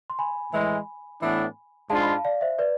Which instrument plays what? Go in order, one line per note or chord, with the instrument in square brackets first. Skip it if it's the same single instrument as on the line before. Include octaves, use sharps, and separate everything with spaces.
[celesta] C6
G#5 B5
[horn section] A2 E3 G#3
A2 E3 B3 D4
[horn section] G#2 G#3 D4 F4 [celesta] F5 A5
[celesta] B5
F5 A5
D5 F5
C5 E5
B4 D5